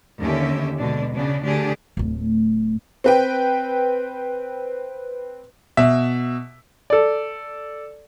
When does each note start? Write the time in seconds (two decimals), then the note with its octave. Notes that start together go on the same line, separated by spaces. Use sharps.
0.19 D#2 D3 C#4 G4 E5
0.79 B2 D3 G#3 D4
1.15 C#3 B3 D4
1.44 D2 D3 D4 G4 G#4
1.97 D1 A2
3.04 C4 B4 G5
5.77 B2 E5
6.90 A4 D5